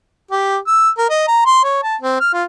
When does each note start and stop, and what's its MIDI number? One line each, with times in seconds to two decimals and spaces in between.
0.31 0.57 67
0.67 0.90 88
0.98 1.07 70
1.10 1.26 75
1.28 1.44 82
1.46 1.61 84
1.64 1.82 73
1.83 1.96 81
2.01 2.16 60
2.20 2.29 89
2.33 2.44 65